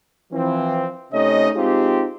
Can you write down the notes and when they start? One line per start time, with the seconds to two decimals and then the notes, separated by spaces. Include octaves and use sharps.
0.32 E3 F3 C4
1.13 C3 A3 C#4 D#4 C#5 D#5
1.55 G#3 C4 D#4 F4 G4